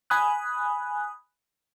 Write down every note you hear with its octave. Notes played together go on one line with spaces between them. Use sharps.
G#5 B5 D#6 F#6